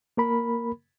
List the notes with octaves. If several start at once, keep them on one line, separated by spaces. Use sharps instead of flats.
A#3 A#4 B5